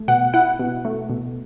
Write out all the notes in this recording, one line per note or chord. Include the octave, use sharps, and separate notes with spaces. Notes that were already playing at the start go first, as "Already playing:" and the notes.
Already playing: A3
B2 F#5
E4 F#5
B2
A3
B2